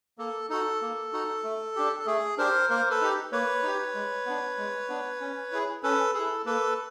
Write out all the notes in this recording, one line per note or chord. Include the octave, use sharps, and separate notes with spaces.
A#3 A4
D#4 F#4 A4
A#3
D#4 F#4
A3
D4 G4
A4
A3 G#4
D4 G4 A#4 C5
A#3 A#4 C5
A4 B4
D#4 G4
A#3 B4 C#5
D#4 G4
G#3
B3 D4
G#3
B3 D4
C#4
E4 G#4
C#4 A4 B4
E4 G#4 A4
A#3 A4 B4